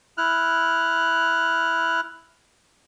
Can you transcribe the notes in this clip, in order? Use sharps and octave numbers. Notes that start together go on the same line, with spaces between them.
E4 F6 F#6